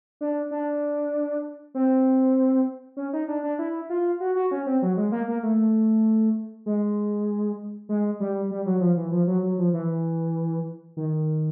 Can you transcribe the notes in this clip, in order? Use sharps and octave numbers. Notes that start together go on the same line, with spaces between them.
D4
D4
C4
C#4
D#4
D4
D4
E4
F4
F#4
F#4
C#4
C4
F#3
G#3
A#3
A#3
A3
G#3
G#3
G3
G3
F#3
F3
E3
F3
F#3
F#3
F3
E3
D#3